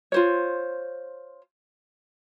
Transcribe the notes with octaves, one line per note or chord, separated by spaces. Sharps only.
F4 C5 C#5